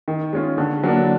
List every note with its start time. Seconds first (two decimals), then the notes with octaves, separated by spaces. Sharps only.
0.08 D#3
0.33 G#3 C#4 F4
0.58 D3
0.83 F#3 A#3 D4